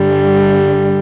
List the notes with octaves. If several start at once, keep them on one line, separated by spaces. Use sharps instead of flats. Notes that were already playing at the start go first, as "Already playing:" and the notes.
Already playing: G2 D3 G3